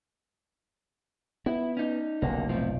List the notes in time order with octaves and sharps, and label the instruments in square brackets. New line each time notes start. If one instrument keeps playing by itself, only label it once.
[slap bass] B3 [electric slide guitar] E4
[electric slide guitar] C#4 D#4
[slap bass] F1 B1 [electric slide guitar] D3 A#3
[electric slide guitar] A2 F3 C4